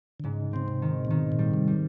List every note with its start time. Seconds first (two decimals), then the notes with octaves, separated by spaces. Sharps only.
0.20 D3
0.24 G#2 C#3
0.53 C#3 C4
0.68 C3
0.82 D#3
1.05 A#2
1.11 B2 D#3
1.32 A#2
1.39 G3
1.54 C3
1.67 G3